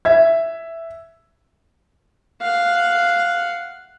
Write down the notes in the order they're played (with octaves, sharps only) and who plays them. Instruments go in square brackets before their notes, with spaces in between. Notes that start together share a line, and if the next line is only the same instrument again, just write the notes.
[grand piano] E5 G#6
[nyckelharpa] F5 F#5